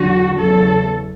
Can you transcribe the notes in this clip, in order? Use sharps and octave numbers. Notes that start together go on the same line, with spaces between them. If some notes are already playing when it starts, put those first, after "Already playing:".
Already playing: E2 D3 F#3 F#4
E2 C#3 F#3 A4